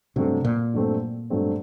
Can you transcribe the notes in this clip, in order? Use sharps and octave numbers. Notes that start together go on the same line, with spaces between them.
G2 C3 F#3 A3 C4
A#2
G2 F#3 A3 C4
G2 F#3 A3 C4